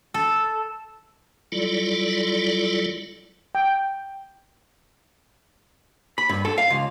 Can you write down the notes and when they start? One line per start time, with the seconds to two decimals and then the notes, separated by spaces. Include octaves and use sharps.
0.14 A4
1.52 F#3 G3 E4 F4 A4 D5
3.55 G5
6.18 B5
6.29 G2
6.45 A4
6.58 F5
6.70 C#2